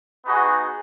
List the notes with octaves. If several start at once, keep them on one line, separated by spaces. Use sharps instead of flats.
B3 D#4 F#4 G#4